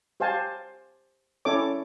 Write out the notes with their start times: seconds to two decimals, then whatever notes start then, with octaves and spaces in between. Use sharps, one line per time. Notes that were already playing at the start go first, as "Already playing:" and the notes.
0.20 G4 C5 F5 G#5 A5
1.45 C#4 E4 A4 C#5 D5 D6